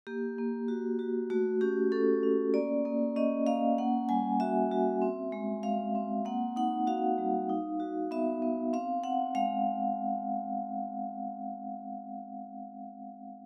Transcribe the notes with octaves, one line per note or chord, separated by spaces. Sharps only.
A#3 G4
A#3
F#4
F#4
A3 F#4
C#4 G4
C#4 A4
C#4
A#3 D5
A#3
C#4 D#5
A#3 F5
A#3 F#5
G3 G#5
F#4 E5
F#4
C4
G#3
G#3 F5
C4
A#3 F#5
D#4 F#5
F#4 F5
G3
D#4
F#4
B3 E5
B3
C4 F5
C4 F#5
G#3 F5